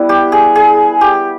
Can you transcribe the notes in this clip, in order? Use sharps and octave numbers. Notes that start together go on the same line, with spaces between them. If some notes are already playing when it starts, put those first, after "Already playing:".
Already playing: G3 B3 E4
G4
G#4
G#4
G4